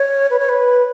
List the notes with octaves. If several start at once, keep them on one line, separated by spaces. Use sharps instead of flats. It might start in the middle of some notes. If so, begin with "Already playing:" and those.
Already playing: C#5
B4
C#5
B4